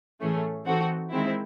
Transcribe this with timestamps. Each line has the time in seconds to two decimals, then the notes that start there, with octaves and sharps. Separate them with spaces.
0.20 A2 E3 A3 C#4 G#4
0.66 E3 C4 D#4 F#4 A4
1.11 D#3 G#3 C4 E4